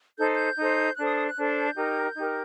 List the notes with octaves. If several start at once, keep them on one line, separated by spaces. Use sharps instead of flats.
D#4 A4 C5 G6
G6
D#4 A4 C5
D4 A4 C5 F#6
D#6
D#6
F#6
D4 A4 C5
G6
D#4 G4 A#4
D#4 G4 A#4